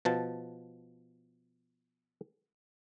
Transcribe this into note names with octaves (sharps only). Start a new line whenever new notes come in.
B2 F3 A5